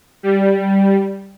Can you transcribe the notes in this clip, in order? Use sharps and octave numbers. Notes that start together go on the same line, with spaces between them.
G3